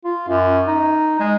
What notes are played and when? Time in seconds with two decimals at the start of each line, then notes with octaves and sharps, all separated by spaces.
0.04 F4
0.28 F#2
0.67 D#4
1.19 G#3